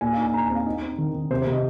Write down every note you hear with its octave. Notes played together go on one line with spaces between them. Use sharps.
A#2 G#5
D#4 F5
G#5
D#4 A#5
G#5
C4
F5
D#4 D#5
C4
D#3
D#3
C3 C5
C5
C3
D#5